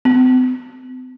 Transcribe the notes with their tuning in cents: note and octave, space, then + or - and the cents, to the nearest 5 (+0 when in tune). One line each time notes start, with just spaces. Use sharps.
C4 -45